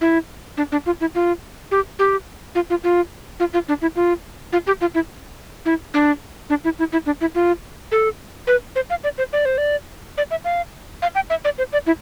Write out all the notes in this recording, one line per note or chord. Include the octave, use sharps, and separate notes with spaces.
E4
D4
D4
F4
E4
F4
G4
G4
F4
F4
F4
F4
F4
D4
E4
F4
F4
G4
F4
E4
E4
D4
D4
E4
E4
E4
D4
E4
F4
A4
B4
C5
F5
D5
C5
D5
C5
D5
D5
E5
F5
F5
G5
E5
D5
C5
D5
E4